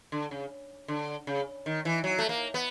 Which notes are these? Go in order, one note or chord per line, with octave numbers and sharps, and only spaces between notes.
D3
C#3
D3
C#3
D#3
E3
F#3
A3
A#3
B3